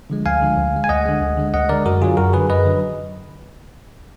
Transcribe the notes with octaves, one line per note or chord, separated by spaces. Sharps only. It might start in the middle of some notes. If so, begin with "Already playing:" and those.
D3 F3 G#3
D2 F5 G#5
D3 F3 G#3
D2
D3 G#3
G#5
D2 D#5 F#5
D3 G#3
D2
D3 G#3
D2 D#5 F#5
D3 G#3 A#4 D5
F#2 F#4 A#4
D3 F#3 F4 G#4
F#2 F#4 A#4
D3 F#3 G#4 B4
F#2 B4 D#5
D3 F#3